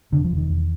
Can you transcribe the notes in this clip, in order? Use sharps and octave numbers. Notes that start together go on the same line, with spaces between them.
E1 D3
F3
E1
D#3
E2